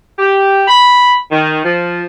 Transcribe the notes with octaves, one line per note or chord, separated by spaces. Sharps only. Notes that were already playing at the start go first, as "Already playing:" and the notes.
G4
B5
D#3
F3